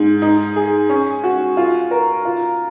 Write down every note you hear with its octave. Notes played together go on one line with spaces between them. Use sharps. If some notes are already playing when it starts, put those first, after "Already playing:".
Already playing: G#2
D#4
G#4
C#4
F#4
F4
A#4
F4